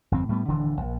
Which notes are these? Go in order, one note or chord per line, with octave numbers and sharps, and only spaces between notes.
G1 F2 C4
A2 G3 A3 B3
D#1 D3 E3 D4
A#1